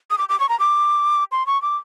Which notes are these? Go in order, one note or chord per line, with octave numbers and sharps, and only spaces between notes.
D#6
D6
D6
C#6
A#5
D6
C6
C#6
D6